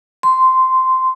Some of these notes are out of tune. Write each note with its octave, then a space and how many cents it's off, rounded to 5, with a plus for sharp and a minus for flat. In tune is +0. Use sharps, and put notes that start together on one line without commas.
C6 -10